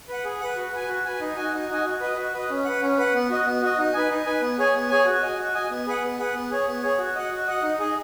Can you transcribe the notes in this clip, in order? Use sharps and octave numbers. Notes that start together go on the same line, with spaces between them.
B4 F#5
G#4
B4 F#5
F#4
B4 G#5
F#4
B4 G#5
D#4
F#4 D#5 G#5
D#4
F#4 D#5 G#5
F#4
B4 D#5
F#4
B4 D#5
C#4
B4 F#5
C#4
B4 F#5
B3
F#4 D#5
B3
F#4 D#5
D#4
B4 G#5
D#4
B4 G#5
B3
G#4 C#5 G#5
B3
G#4 C#5 G#5
F#4
D#5 G#5
F#4
D#5 G#5
B3
G#4 B4 F#5
B3
G#4 B4 F#5
B3
G#4 C#5
B3
G#4 C#5
F#4
D#5 F#5
F#4
D#5 F#5
D#4
G#4 D#5